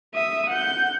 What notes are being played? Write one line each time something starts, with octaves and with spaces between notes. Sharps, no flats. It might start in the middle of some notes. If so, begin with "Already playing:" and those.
E5 D#6
F#5 G6